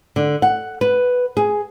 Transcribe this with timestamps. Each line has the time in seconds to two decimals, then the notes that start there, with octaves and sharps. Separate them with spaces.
0.16 D3
0.42 F#5
0.81 B4
1.37 G#4